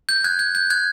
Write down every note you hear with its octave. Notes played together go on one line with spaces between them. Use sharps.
G6
F#6 G#6
G6
G6
F#6 G#6